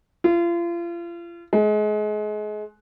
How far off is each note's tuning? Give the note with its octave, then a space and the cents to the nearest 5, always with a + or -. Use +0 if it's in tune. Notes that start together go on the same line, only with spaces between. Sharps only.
F4 -35
G#3 +30